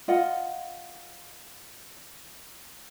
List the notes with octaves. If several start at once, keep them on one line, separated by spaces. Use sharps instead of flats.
F4 D#5 F#5